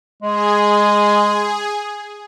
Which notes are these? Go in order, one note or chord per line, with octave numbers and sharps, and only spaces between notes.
G#3 G#4